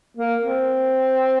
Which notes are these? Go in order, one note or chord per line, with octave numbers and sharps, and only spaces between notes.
A#3
C4